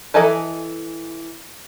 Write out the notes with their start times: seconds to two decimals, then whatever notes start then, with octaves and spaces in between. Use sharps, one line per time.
0.14 E3 A4 D#5 G#5 A5